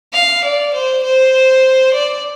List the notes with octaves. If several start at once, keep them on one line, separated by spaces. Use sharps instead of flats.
F5
D5
C5
C5
D5